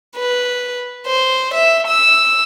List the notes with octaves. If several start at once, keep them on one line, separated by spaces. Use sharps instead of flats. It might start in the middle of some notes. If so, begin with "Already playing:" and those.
B4
C5
E5
E6